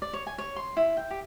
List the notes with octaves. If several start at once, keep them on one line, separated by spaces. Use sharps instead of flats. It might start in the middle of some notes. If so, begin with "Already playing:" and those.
D5
C#5
G#5
C#5
C6
E4
G5
G4